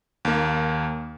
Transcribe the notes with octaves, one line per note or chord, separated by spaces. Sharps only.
D#2 A#3